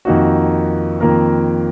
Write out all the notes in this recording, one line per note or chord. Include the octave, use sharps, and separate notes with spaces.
F2 D#3 A#3 D#4 F#4
F2 D#3 A#3 F4 A#4